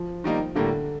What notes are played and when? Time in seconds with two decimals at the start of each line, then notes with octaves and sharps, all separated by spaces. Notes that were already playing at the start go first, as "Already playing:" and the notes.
Already playing: F3
0.24 D#3 G3 A#3 D#4
0.55 A2 D3 G3 A#3